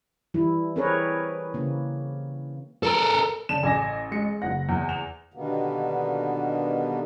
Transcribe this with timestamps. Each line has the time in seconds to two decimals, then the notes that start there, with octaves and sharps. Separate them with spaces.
0.34 E3 G3 E4
0.76 C4 G#4 A#4 B4 C#5
1.54 C#3 A#3
2.83 A4 A#4
3.49 C#3 D5 A5 E7
3.63 A1 G#5 D6 A#6
4.11 G#3 C#7
4.42 F#1 F#5 A#6
4.69 E2
4.89 F7
5.34 B2 D3 D#3 G3 A#3 B3